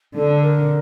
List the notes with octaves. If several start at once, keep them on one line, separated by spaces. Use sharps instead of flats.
D3 A4
A#4